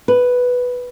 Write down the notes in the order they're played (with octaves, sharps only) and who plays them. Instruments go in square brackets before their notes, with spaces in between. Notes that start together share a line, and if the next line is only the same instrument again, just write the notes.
[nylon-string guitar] B4